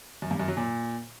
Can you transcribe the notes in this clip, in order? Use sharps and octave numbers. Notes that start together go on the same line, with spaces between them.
F#2
G2
F#2
F#3
A#2